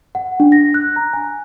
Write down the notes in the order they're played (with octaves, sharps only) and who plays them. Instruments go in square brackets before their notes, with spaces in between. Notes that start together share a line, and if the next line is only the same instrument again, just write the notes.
[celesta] F#5
D4
A#6
F#6
A#5
G#5